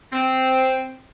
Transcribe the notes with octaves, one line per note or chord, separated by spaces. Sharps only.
C4